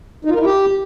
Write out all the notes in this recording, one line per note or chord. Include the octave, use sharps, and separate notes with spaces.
D#4
F4
A#4
E4
G4